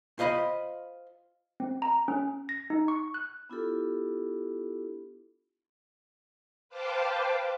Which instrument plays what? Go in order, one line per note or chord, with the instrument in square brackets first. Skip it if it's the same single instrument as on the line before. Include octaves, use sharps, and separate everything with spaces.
[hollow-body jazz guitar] F4 C5 D#5 B5
[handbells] C4
A#5
C#4
A#6
D#4
C#6
F#6
[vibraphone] B3 D4 E4 F4 G4 A4
[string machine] B4 C5 F5 G5 A5 D6